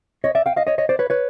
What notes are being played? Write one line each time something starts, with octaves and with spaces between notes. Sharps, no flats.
C#5 D#5
D5 E5
F5 G5
D#5 F5
C#5 D#5
C#5 D#5
C5 D5
B4 C#5
B4 C#5